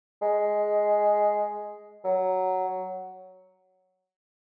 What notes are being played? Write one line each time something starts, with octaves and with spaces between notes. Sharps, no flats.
G#3
F#3